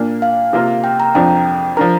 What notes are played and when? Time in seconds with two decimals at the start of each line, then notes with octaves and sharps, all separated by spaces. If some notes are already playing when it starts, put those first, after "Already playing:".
Already playing: A#2 A#3 D4
0.22 F5
0.53 C3 A#3 F4 A#4
0.84 G5
1.00 A#5
1.15 F2 F3 D4 G5
1.77 F3 D4 A#4 A#5